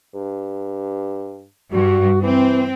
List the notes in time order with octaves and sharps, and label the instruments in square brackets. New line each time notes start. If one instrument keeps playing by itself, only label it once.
[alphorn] G2
[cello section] G2 [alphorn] F#4
[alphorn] E3 [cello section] C4